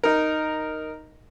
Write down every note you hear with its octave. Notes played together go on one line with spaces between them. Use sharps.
D#4 A#4